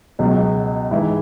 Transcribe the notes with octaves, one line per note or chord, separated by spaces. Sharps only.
C#2 B2 F#3
G#2 E3 E4